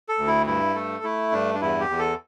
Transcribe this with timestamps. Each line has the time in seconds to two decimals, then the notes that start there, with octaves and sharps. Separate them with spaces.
0.09 A4
0.18 D2
0.27 E4
0.46 G2 E4
0.75 A3 A4
1.04 A3 E4
1.32 G2 D4
1.54 D4
1.61 E2 E4
1.80 G4
1.89 E2
1.99 A4